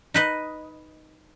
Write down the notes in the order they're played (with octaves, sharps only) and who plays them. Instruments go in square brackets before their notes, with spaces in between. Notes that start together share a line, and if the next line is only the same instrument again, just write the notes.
[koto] D#4 B4 D#5